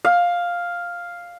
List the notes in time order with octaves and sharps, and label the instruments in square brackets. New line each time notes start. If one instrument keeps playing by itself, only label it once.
[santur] F5